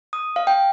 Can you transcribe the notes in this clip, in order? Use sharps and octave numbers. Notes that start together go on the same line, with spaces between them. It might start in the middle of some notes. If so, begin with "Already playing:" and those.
D#6
F5
G5